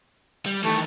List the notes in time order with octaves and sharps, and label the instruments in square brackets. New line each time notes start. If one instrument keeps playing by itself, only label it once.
[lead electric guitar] G3
[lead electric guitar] D#3 E3 [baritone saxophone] A3